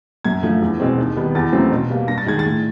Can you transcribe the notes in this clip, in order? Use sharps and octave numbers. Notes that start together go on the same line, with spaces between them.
F#2 G#6
D3 F3 A3
E2
B2 G#3 C4
D#2
D#3 G3 B3
E2 A6
C#3 F#3 A3 C4
B2
G3 A#3
G2 A#6
A6
D#3 G#3 G#6
A6
A2